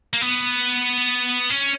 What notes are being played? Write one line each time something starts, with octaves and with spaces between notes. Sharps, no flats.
A#3
B3
C#4